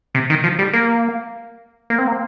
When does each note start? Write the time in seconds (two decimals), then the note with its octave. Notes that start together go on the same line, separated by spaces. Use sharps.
0.15 C3
0.30 D#3
0.44 F3
0.59 G3
0.73 A#3
1.90 A#3
1.98 C4
2.07 A#3